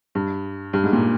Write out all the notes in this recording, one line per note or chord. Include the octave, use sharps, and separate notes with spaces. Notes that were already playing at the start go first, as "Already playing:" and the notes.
G2
G2
G#2
A#2